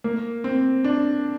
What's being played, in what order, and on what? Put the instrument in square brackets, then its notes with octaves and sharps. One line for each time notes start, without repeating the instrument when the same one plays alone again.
[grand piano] A#3
C4
D4